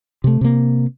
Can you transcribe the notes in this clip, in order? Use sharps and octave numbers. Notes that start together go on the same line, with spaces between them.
C3 A3
C3 A#3